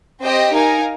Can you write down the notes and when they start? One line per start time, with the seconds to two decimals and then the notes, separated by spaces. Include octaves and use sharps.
0.22 C4 G4 C5 D#5 G5
0.52 D#4 A#4 F5 G#5